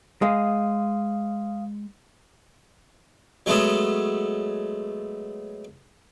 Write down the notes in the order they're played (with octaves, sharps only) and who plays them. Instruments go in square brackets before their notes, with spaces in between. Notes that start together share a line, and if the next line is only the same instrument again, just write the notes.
[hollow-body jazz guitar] G#3 [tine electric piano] F5 D#6
[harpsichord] F#3 G#3 A3 B3 A4 C#5